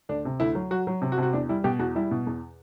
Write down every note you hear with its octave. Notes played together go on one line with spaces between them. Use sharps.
D2 D4
C3
D2 E4
F#3
F#3 F#4
F#3
C3
F#4
C3
F#4
E2 D4
G3 E4
B2 G4
E2 F#4
G3 E4
B2
E2